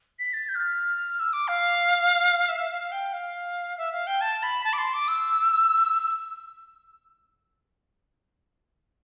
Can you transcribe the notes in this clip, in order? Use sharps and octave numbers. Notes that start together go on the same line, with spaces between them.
B6
A6
G6
F6
E6
D6
F5
E5
F5
G5
F5
E5
F5
G5
A5
B5
A5
D6
C6
D6
E6